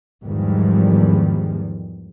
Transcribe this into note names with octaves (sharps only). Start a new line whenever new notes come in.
E2 G#2 D#3 F3 G3 G#3